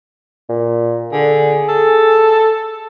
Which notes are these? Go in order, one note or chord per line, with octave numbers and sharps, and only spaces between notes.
A#2
D3 G#4
A4